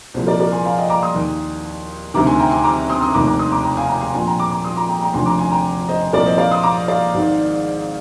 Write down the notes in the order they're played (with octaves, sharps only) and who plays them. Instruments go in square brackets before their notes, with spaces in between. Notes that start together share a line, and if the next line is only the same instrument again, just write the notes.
[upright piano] C2 A#2 F3 G#4 C5
A#4 D5
A#4 D5
G#5 C6
F5 G#5
D#5 G5
A#5 D6
C6 D#6
D#2 D#3
D2 C3 D#3 A#5 D6
G#5 C6
G5 A#5
G#5 C6
A#5 D6
C6 D#6
C6 D#6
F1 D#2 D#3 A#5 D6
A#5 D6
C6 D#6
A#5 D6
G5 A#5
F5 G#5
G5 A#5
G#5 C6
A#1 A#2 F3 G#5 C6
G5 A#5
A#5 D6
A#5 D6
C6 D#6
A#5 D6
G5 A#5
G5 A#5
F1 D#2 D3 F3 G#5 C6
A#5 D6
G#5 C6
G5 A#5
C5 D#5
C2 A#2 F3 A#4 D5
C5 D#5
D5 F5
C6 D#6
A#5 D6
D5 F5
G#1 G#2 D#3